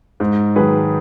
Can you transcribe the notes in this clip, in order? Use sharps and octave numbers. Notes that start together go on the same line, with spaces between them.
G#2
D#3 F#3 G#4 B4